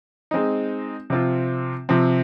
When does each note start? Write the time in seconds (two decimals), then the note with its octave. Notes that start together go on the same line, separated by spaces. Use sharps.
0.31 G#3 C4 D#4
1.10 C3 F3 C4 F4
1.89 C3 F3 C4